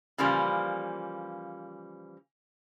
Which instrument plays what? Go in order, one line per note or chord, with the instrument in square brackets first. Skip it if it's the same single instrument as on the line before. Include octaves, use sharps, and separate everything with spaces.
[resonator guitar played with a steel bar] C#3 E3 F3 G3 A#3